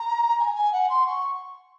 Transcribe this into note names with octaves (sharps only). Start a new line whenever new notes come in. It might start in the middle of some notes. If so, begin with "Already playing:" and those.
Already playing: A#5
G#5
G#5
F#5
C6
C#6